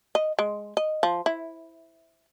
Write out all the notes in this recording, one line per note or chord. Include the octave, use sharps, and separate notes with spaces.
D#5
G#3
D#5
F3
E4